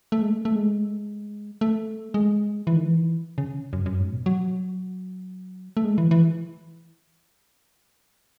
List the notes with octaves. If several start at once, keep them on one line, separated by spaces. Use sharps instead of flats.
A3
G#3
A3
A3
G#3
A3
G#3
E3
D#3
E3
C#3
F#2
F#2
G#2
B2
F#3
A3
G#3
E3
E3